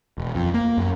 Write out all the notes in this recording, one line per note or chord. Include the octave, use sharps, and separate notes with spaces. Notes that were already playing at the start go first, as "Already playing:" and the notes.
E1
F2
A#3
F#2